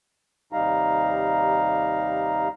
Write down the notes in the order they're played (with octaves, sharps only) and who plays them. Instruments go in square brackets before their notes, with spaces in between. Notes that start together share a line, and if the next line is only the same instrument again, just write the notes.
[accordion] D#2 C3 G3 D#4 F5 A#5